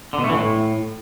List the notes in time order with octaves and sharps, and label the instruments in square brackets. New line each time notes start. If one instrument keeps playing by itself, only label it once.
[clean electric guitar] D3
B2
A3
E3
A2